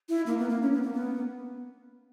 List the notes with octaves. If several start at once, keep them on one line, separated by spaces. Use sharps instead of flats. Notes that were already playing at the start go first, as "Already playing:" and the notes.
E4
A#3
B3
A#3
C#4
B3
A#3
B3